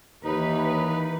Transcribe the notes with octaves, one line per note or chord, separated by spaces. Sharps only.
D#2 E3 D#4 B4